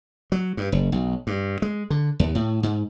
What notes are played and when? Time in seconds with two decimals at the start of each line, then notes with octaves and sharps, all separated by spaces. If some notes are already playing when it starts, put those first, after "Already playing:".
0.32 F#3
0.57 G2
0.72 F#1
0.92 B1
1.27 G2
1.62 G#3
1.90 D3
2.20 D#2
2.35 A2
2.63 G#2